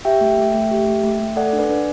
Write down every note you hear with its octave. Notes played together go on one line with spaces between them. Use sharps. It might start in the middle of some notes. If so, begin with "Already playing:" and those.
G4 E5 G5
A3
A3
A3
G4
A3
A3
A3
A4 D5 F#5
D4
B4 D5
D4